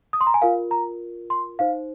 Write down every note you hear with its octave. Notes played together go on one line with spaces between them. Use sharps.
D#6
C6
A#5
G#5
F4 A#4 F5
A#5
C6
D#4 C5 F5